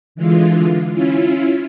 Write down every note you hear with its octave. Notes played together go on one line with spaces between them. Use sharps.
D3 E3 G#3 F4
C#4 E4 F4